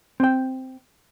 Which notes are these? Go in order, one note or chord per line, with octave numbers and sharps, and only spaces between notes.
C4 G5